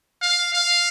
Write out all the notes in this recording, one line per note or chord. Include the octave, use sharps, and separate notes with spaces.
F5
F5